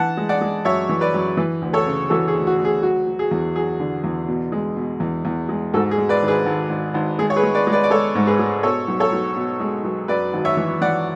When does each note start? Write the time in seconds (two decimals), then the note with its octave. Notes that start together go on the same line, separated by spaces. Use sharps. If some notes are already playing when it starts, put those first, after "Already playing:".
Already playing: E3 F#5 A5
0.17 G#3
0.29 D5 F#5
0.41 G#3
0.65 F#2 C#5 E5
0.89 E3
1.01 B4 D5
1.14 F#2
1.37 E3
1.62 D2
1.73 A4 C#5
1.86 C#3
2.10 E3 F#4 A4
2.28 G#4
2.34 D2
2.47 F#4
2.58 D2
2.65 G#4
2.83 F#3 F#4
3.07 F#3
3.19 G#4
3.31 E2
3.56 F#3 G#4
3.80 D3
4.04 E2
4.28 B2
4.52 G#3
4.77 B2
5.00 E2
5.25 E2
5.49 G#3
5.73 G#2 F#4 A4
5.91 G#4
5.98 G#3
6.09 B4 D5
6.22 G#1
6.28 G#4 B4
6.46 G#1
6.70 G#1
6.94 G#1
7.19 G#3 G#4
7.30 C#5
7.36 G#4 B4
7.43 G#3
7.55 B4 D5
7.67 G#3
7.72 B4 D5
7.84 D5
7.90 G#3 A4 C#5
8.15 G#2
8.27 G#4 B4
8.39 G#3
8.63 B2 A4 C#5
8.88 B1
9.00 A4 C#5
9.12 B1
9.36 B2
9.60 G#3
9.84 B1
10.08 F#2 B4 D5
10.33 G#1
10.45 C#5 E5
10.57 E3
10.81 E3 D5 F#5